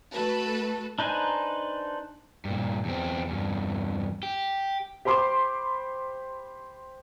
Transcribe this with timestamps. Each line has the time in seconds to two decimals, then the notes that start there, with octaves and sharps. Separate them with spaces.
0.13 A3 F#4 A4 B4
0.99 D4 D#4 B4 C5 G#5
2.45 G2 A#2
2.85 E2 C4
3.29 E2 G2
4.23 G4
5.05 G4 C5 B5 C6 D6